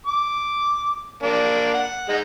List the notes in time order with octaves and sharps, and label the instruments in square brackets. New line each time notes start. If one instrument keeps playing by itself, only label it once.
[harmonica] D6
A#3 D4
F#5
G#3 D#4